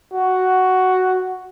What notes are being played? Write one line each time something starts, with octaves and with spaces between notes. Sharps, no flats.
F#4